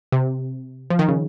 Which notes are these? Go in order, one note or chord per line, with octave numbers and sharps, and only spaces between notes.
C3
F3
D#3
C#3